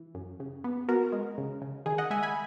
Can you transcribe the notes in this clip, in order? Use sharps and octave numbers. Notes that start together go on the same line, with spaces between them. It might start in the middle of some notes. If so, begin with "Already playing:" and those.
Already playing: E3
F#2
C#3
B3
B3 F#4 A#4
G#3
C#3
C#3
D#3 G#4
D#5 F#5
G#3 E5 G#5
G#5 B5